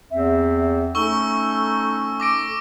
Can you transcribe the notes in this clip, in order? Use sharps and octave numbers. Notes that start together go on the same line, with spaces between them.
E2 C4 E5
A3 C#4 D#4 A4 C#6 E6 G7
D6 A#6 D7